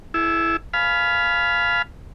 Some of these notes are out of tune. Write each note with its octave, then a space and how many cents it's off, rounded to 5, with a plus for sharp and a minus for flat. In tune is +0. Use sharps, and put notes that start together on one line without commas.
E4 +0 G#4 +45
F5 +0 G#5 +35 B5 +0